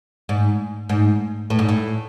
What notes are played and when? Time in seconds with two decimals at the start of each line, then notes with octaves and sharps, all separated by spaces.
0.29 G#2
0.89 G#2
1.50 A2
1.59 G#2
1.69 A2